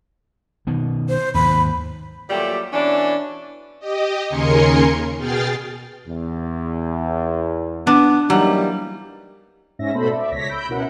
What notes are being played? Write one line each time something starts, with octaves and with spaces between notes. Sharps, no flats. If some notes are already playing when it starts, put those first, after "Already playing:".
B2 D#3
C5
D#2 G#2 B5
A#2 F#3 G3 A3 G4
B2 E3 C#4 D4
G4 D#5
D#2 C#3 A#4 G#5 C6 C#7
B2 G#4 G5 F6 A6 C7
E2
B3 D4
E3 F#3 G3 A#3 D#4
G#2 C#4 E5 A#6
B2 A3 A4 C5 B5
D5 E5
C#2 C#5 A#6 B6
B5 E6 G6 D7
B2 C#4 E4 A#4 F#5